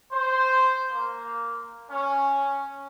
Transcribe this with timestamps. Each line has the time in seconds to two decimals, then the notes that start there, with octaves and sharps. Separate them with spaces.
0.12 C5
0.91 A#3
1.90 C#4